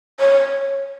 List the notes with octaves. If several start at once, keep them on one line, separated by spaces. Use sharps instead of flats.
C#5